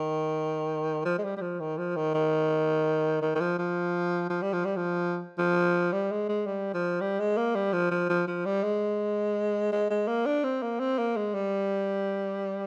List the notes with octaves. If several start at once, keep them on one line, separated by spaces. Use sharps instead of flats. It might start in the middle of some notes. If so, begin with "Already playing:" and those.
Already playing: D#3
F3
G#3
G3
G3
F3
D#3
F3
D#3
D#3
D#3
D#3
F3
F3
F3
G3
F3
G3
F3
F3
G3
G#3
G#3
G3
F3
G3
G#3
A#3
G3
F3
F3
F3
F3
G3
G#3
G#3
G#3
A#3
D4
C4
A#3
C4
A#3
G#3
G3